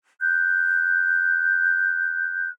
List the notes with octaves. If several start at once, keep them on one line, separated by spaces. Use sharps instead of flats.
F#6 G6